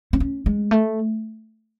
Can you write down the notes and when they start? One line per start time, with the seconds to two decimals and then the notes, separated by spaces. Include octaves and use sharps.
0.13 C4
0.20 C#4
0.46 G#3
0.71 A3